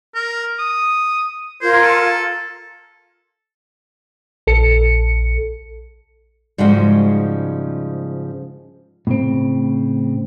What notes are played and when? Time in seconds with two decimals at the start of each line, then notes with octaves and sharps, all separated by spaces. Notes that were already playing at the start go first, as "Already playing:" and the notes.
0.15 A#4
0.59 D#6
1.62 F4 A#4 C5 G#6
1.82 A4
4.47 A#1 A4 C#7
6.58 G#2 C#3 F3 G3 G#3 F#4
9.07 A2 C#3 C4